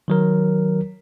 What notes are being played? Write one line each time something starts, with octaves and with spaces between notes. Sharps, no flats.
D#3 F#3 A#4